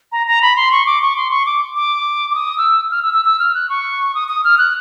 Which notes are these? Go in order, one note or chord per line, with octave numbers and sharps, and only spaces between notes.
A#5
A#5
B5
C6
C#6
D6
C#6
C6
C#6
D6
D6
D6
D#6
E6
F6
E6
E6
E6
F6
F#6
C#6
D#6
D#6
F6
F#6